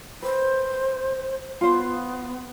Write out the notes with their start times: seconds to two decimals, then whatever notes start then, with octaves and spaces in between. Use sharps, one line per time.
0.22 B4 C5
1.61 B3 F4 C5